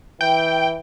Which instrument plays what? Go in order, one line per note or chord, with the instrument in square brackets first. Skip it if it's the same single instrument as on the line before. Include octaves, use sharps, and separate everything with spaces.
[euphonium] E3 [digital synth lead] G5